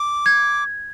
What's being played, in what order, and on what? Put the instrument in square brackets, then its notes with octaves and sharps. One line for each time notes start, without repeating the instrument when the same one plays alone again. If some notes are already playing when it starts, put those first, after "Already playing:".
Already playing: [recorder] D6
[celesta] G#6